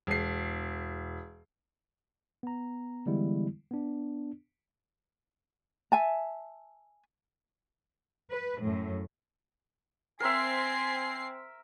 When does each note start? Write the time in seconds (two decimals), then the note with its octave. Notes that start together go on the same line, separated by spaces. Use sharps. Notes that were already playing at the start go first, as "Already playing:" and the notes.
0.07 E1 C7
2.43 B3 A#5
3.06 D3 E3 G3 G#3 B3 E4
3.71 B3 D4
5.92 E5 G#5 A5
8.30 B4
8.61 F#2 A2
10.20 C4 A#4 E5 G#5 C7